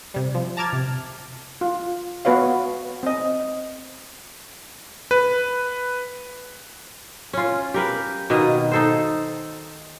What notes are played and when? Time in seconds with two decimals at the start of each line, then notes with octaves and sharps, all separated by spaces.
0.14 C3 G3
0.34 F3
0.57 A5 A#5 D6 F6 G#6 A6
0.73 C3
1.61 F4
2.25 B3 F#4 B4 C#5 F5
3.03 C4 D#5
5.11 B4
7.33 C#4 F4
7.74 G4 A#4 B4
8.30 B2 D#3 A#3 D#5
8.71 D#4 A4 C5